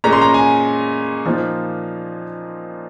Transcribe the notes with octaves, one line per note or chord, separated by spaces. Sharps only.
A#2 G#3 C#4 A#5
C6
A#5
G#5
A#2 F3 A#3 D#4